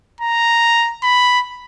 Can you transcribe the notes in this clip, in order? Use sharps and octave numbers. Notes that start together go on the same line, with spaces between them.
A#5
B5